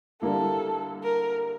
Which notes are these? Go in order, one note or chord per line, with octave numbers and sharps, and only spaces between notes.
D3 G3 A#3 E4 A4
A#4